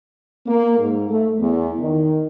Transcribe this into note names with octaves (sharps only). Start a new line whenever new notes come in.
A#3
G#2
A3
E2
D#3